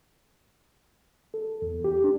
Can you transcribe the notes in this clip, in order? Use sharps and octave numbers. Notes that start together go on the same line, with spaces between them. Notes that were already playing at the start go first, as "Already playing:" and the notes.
A4
E2
G4
D4